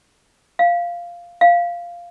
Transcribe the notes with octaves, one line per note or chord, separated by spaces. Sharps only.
F5
F5